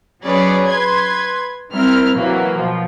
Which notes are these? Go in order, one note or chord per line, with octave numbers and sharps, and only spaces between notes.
F#3 C#4 G#4 B4 C#5 D5
B4 C6 G#6
G3 C4 E4 A#4 F6
C3 E3 F#3 A#3
B2 F3